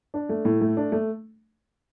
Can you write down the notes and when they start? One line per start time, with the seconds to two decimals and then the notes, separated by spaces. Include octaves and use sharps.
0.14 D4
0.29 A3
0.45 A2
0.61 A3
0.77 D4
0.92 A3